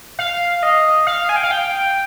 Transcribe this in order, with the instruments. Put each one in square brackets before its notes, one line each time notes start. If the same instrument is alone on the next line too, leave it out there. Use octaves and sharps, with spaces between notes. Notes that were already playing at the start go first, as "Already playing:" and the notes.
[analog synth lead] F5
D#5
F5
G#5
G5
F5
G5